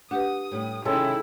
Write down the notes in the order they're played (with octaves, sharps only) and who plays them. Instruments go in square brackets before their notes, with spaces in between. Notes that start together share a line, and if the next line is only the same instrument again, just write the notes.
[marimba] D4 G4 B4 [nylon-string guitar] F#5 [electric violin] D#6
[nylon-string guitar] A2 G3
[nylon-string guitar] C3 D#3 C#4 [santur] G#3 A4 [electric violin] D#4 E4 [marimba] C#5